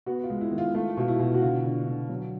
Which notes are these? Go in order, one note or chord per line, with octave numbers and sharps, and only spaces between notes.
B3 F#4
F4
G#3
E4
D#3
F4
A3 F4
B2 F4
E4
B2
F#4
D3 F4
D3
D3
F#3